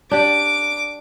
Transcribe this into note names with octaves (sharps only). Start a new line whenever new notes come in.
D4 G4 D6